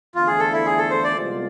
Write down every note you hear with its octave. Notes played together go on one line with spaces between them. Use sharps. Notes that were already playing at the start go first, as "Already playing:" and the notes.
E2 D3 F3 A3 F4
G#4
A4
E4
G#4
A4
C5
D5
C2 C3 G#3 B3 F4